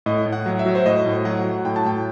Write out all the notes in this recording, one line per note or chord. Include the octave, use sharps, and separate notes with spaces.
A2 D#5
A2
F#5
F#3
E5
F#3
C5
A2 D#5
A2
F#3 F#5
F#3
A2 G5
A5
A2 G5